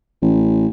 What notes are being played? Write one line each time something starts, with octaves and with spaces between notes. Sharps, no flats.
A1